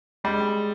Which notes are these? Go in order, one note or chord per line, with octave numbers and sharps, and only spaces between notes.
G3 G#3